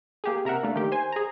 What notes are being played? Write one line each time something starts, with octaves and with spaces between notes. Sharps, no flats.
A#3 G4 G#4
C3 A#4 E5 F#5
A3 A#3 D4
D#3 G4
C5 G#5
G#4 A#5